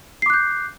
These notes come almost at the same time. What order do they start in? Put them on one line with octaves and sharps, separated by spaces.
C7 D6 F#6 G6